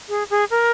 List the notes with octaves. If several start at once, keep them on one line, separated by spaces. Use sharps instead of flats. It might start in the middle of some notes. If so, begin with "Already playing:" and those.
G#4
G#4
A#4